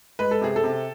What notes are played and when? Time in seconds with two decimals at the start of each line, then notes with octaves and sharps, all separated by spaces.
0.19 G#3 B4
0.31 A4
0.41 C3 G#4
0.56 A4
0.64 C3